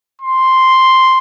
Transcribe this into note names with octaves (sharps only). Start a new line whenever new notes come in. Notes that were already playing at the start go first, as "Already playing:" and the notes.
C6